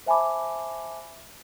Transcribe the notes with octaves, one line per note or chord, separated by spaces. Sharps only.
C5 E5 G#5 A5 B5 D6